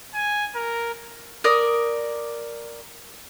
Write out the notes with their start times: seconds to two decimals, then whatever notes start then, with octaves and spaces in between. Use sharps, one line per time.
0.14 G#5
0.55 A#4
1.44 A#4 D5 D#6